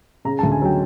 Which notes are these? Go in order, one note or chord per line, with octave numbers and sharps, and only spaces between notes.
C#3 A#5
A5
D2
G#5
F#3 G5